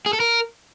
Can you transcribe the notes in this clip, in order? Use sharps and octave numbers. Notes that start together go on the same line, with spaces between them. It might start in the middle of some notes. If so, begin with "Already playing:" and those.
G#4
A4
A#4